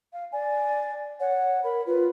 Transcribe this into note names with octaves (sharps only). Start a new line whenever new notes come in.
F5
D5 G#5
C#5 F#5
A#4 B5
F4 B4